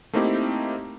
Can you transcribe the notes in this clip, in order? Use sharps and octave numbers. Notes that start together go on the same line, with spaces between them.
A3 A#3 C4 D#4 E4 G4